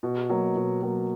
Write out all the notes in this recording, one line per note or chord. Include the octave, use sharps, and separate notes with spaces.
B2
F#3 A#3
B2
F#3 A#3